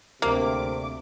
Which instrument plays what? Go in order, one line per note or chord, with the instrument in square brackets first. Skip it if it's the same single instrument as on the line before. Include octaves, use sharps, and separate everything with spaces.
[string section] D2 D6 [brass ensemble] C3 [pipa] A#3